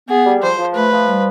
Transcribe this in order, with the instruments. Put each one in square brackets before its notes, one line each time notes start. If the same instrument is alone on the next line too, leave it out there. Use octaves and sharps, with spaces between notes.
[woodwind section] B3 [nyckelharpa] G#4
[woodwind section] G3
[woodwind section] F3 [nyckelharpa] C5
[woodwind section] F3
[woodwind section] A3 [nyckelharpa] B4
[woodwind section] F3
G3